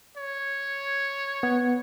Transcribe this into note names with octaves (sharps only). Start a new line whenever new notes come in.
C#5
B3